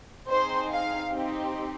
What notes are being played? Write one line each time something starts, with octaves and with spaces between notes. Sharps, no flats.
C4 D#4 G#4 C5
F5
C4 D#4 G4